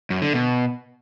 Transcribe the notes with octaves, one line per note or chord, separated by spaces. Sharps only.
F#2
D3
B2